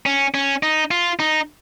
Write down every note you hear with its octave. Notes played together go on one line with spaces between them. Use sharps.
C#4
C#4
D#4
F4
D#4